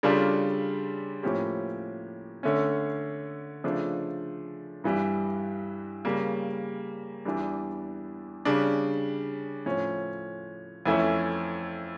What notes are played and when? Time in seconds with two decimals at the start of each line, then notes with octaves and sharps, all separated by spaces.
0.03 C#3 G3 D4 F4 A4
1.23 A2 F3 A#3 C#4 G4
2.43 D3 A3 C#4
3.64 C#3 F3 A3 D4
4.84 G2 E3 G3
6.05 C#3 G3 A#3
7.25 E2 E3 G3 D4
8.45 C#3 G3 D4
9.66 A2 F3 C#4
10.86 F2 E3 A3 C#4 E4